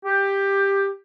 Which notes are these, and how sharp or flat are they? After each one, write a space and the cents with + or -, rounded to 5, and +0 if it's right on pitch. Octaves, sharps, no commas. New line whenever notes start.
G4 +10